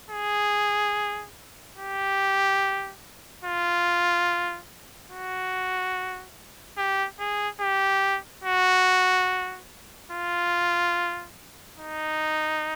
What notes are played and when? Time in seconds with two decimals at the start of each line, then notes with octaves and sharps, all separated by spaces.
0.11 G#4
1.77 G4
3.44 F4
5.11 F#4
6.78 G4
7.20 G#4
7.61 G4
8.44 F#4
10.11 F4
11.78 D#4